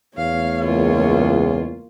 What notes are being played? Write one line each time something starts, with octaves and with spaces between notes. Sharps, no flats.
E2 A3 C#5 F5
C#2 A#3 F4